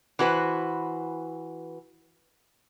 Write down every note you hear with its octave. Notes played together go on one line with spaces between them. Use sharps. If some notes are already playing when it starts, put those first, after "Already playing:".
E3 F#4 B4 C5